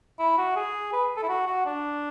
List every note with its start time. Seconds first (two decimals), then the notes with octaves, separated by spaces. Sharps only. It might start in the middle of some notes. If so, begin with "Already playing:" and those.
0.19 E4
0.38 F#4
0.56 G#4
0.93 B4
1.17 A4
1.23 E4
1.29 F#4
1.47 F#4
1.66 D4